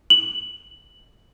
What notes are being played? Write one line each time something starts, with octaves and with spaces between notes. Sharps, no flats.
F#7